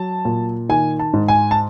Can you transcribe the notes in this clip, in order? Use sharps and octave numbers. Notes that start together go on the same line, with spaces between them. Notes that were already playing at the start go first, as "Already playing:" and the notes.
Already playing: F#3 A5
A#2
D#3 G#5
A5
G#2
G#5
A5